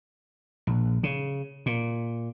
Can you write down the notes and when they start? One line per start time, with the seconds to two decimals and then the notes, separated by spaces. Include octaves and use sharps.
0.67 A#1
1.03 C#3
1.66 A#2